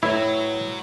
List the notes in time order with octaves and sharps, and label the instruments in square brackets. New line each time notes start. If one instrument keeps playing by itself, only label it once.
[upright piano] A2 [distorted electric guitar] F#3 [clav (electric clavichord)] E4 [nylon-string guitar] B4 C#5